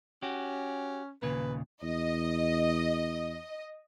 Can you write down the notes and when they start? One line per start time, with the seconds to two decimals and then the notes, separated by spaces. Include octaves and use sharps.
0.23 C#4 F#4 G4
1.22 D#2 A#2 C#3 B4
1.82 E2 D#5